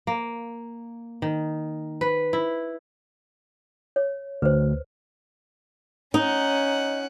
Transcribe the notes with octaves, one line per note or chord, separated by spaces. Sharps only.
A#3
D#3
B4
E4
C#5
D2 B4 C5
C#4 D#4 F#5